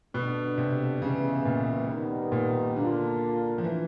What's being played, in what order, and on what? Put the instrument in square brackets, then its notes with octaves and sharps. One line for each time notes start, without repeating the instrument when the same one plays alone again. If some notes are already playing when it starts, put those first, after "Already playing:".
[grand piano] B2 [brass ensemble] D3 G3 B3 D4
[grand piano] C3
[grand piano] C#3 [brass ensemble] E3 G#3 B3
[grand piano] A#2
[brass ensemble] D#3 G3 B3
[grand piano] A#2
[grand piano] D3 [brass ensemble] A#3 D4 F4
[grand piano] F3
E3